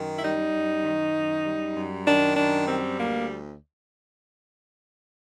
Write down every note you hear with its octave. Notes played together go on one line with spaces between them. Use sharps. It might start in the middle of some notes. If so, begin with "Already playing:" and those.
Already playing: F#2 D#3
E4
G3 D#4
F#2
D#3
F#2
G3
F#2
D#3 D4
F#2 D4
G3 C4
D2 A#3